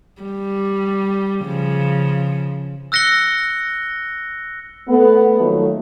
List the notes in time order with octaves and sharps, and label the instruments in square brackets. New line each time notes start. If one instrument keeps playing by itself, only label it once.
[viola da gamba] G3
C#3 F3
[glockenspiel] E6 F#6 A#6 C#7 G7
[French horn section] A3 B3
D#3 F3 F#3 A3 A#3